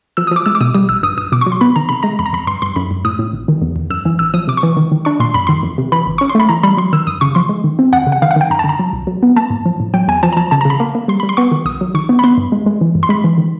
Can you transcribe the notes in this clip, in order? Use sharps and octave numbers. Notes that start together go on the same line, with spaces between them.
F3 E6
D#6
F3 D6
G#3 E6
D6
B2 D#6
G3 D#6
A#1 E6
G2 D#6
G2 D#6
B2 D6
C#6
F#3
C6
B3 B5
D#3 A#5
C3 B5
G#3 A#5
F2 B5
A#5
F2 B5
G2 C6
G2 C6
F#2 B5
F#2
A2 D#6
A2
G#1
D#3
E2
E2
F#2 E6
E3
A1 E6
F3 D#6
C3 D6
C#6
E3
D#3
D#3
D4 C#6
A#2 C6
F#2 B5
D#3 C6
F2
C3
E3 B5
G#1
C#4 C#6
C6
A3 B5
E3 A#5
G3 B5
F#3 C6
D#3 E6
F#2 D#6
C#3 C#6
F3 C6
G#3
D#3
C4
F2 F#5
C#3
F#5
D#3 F5
F#5
D#3 G5
F#2 A#5
A5
D3
A#5
F#3
C2
F#3
B3
A#3 A5
G#2
F3
A2
F#3 G5
E2 G#5
F3 A5
A#5
F3 A5
C#3 A5
A#5
C#3
B5
A#3
A#3
G3 C6
G3 B5
C6
B3 C#6
D#3
B1 D#6
F#3
D#3 C#6
B3
B5
B3 C6
G2
G#3
G#3
E3
G2
C6
G#3 B5
E3
D#3